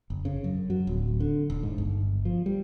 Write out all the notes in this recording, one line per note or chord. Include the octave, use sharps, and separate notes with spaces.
F#1
C#3
F#2
F#3
D1
D3
D#1
G#2
G1
F3
G3